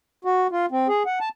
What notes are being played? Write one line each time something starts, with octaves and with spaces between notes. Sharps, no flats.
F#4
F4
C4
G#4
F#5
A5